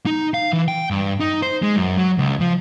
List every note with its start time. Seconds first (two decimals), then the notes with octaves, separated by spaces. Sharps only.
0.06 D#4
0.34 F5
0.53 E3
0.68 G5
0.90 G2
1.20 D#4
1.42 C5
1.62 G#3
1.76 F#2
1.97 F#3
2.18 C#2
2.40 F3